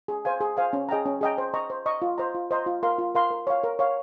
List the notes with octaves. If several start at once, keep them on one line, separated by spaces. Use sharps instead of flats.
G#4
C5 F5 G#5
G#4
C5 F5 G#5
C#4
G#4 D#5 G5 A#5
C#4
G#4 D#5 G5 A#5
C5
D#5 A#5 C#6
C5
D#5 A#5 C#6
F4
C5 D#5 A#5
F4
C5 D#5 A#5
F4
A#4 F5 C6
F4
A#4 F5 C6
A#4
C#5 F5
A#4
C#5 F5